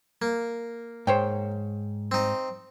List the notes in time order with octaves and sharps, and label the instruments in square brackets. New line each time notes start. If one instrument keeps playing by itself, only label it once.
[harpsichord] A#3
[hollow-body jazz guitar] G#2 [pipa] C5 C#5 G5
[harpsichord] C4 D#4